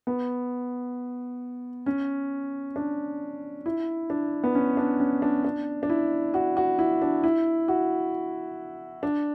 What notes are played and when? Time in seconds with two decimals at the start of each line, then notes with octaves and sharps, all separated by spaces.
0.07 B3
1.86 C#4
2.76 D4
3.66 E4
4.10 D4
4.44 B3
4.55 C#4
4.77 D4
5.00 C#4
5.22 D4
5.44 D4
5.83 D4
5.90 E4
6.34 F#4
6.57 F#4
6.79 E4
7.02 D4
7.24 E4
7.68 F#4
9.03 D4